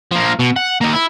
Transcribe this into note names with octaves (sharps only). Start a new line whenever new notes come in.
F3 A#3
B2
F#5
A#3 D#4
E4